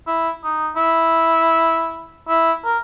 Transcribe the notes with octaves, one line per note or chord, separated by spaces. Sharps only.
E4
D#4
E4
E4
A#4